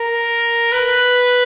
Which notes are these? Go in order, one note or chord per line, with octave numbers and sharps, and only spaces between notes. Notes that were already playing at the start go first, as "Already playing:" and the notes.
Already playing: A#4
B4